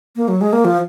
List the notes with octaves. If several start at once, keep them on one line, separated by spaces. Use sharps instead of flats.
A#3
F#3
G#3
A#3
F3